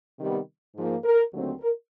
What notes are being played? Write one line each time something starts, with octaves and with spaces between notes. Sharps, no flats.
C3 D#3 G3 B3
G#2 F3 A#3
A#4
D#2 D3 F#3 A3 C4
A#4